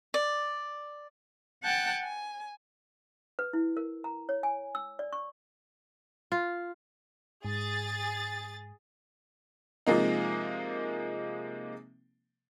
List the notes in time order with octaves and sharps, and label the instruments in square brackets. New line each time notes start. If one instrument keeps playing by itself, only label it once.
[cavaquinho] D5
[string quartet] F#5 G5 A5 F#6 G#6
G#5
[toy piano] B4
E4
A#4
A#5
C#5
G#5
E6
D5
C#6
[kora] F4
[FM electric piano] G#2 [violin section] G#4 A6
[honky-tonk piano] C3 F3 G#3 A#3 D#4